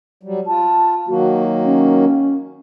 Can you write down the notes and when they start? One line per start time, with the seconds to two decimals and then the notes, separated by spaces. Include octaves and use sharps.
0.23 F#3 G3
0.47 F4 A5
1.08 D#3 F#3 A#3 F#4
1.64 C#4